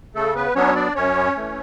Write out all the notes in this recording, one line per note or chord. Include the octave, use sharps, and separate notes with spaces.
C#3 A3 A4
B3 B4
F#3 B3 C#4 D4 C#5
D4 D5
F#2 C#4 C#5
E3 A3